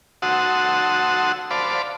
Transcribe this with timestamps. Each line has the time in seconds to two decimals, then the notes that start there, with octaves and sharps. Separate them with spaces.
0.22 F#4 F#5 A5 C6 D#6 E6
1.51 C5 D5 F5 A5 B5 D6